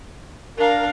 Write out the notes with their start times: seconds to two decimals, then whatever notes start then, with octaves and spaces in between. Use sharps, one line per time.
0.57 D4 A#4 F5